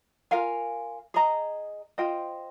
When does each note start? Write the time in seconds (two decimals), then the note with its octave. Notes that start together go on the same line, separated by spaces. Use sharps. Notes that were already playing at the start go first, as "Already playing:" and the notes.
0.31 F4 A#4 F5 G#5
1.14 G#4 D#5 A#5
1.98 F4 C5 D#5 G5